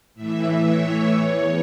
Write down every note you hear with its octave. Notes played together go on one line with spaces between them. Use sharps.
A2 E3 E5
C#5
E2 E3